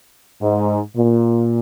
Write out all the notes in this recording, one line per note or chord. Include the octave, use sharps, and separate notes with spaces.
G#2
A#2